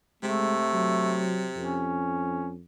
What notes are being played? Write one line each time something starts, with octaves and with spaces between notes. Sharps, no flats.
C3 G#3 A3
F#3
F2 C#4